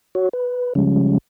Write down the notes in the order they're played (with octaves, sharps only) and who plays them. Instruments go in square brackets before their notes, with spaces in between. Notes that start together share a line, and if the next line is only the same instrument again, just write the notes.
[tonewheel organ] F#4 C#5
B4
C#3 F3 G3 G#3 C#4